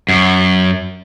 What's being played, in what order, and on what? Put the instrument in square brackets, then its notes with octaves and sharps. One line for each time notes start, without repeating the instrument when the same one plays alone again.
[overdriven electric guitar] F#2